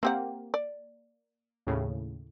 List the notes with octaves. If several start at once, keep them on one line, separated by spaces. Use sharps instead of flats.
A#3 C4 G4 F#5
D5
D#2 A2 C#3